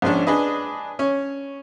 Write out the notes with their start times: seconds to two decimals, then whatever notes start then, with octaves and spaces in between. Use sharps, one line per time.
0.02 A#1 G#2 C#4 D4
0.27 D4 G#4 B4 D#5
0.99 C#4 C#5